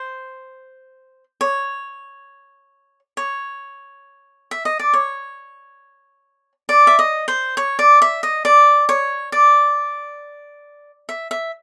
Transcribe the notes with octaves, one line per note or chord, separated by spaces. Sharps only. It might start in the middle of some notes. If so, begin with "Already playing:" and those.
Already playing: C5
C#5
C#5
E5
D#5
D5
C#5
D5
E5
D#5
C5
C#5
D5
E5
D#5
D5
C#5
D5
E5
E5